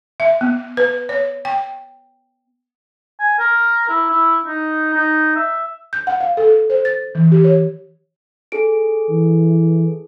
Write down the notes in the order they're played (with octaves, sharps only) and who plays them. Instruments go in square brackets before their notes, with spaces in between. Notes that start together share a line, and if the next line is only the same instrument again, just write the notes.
[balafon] E5
B3
B4
C#5
G5
[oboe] G#5
A#4
E4
E4
D#4
D#4
E5
[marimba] G6
F#5
F5
A4
C5
A6
E3
G4
C#5
[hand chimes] G#4 A4 D7
[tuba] E3